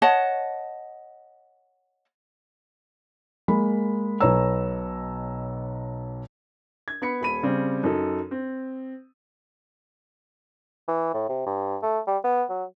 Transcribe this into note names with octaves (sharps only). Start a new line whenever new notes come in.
C#5 D#5 F#5 A5
G#3 A#3 B5
B1 B2 B4 C#5 A#5 E6
G#6
B3 B5 C#7
D#1 B5 D#7
C#3 G3 C4
F#2 D#4 A4
C4
E3
A2
C3
G2
A3
G3
B3
F#3